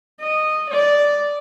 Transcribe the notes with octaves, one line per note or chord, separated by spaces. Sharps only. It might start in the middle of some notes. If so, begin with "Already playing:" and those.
D#5
D5